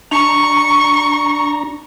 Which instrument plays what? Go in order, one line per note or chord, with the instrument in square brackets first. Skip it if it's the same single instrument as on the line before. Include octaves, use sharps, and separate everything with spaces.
[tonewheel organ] D4 A#5 [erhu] C#6